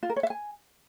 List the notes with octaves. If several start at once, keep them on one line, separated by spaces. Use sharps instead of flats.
F4
A#4
C#5
E5
G#5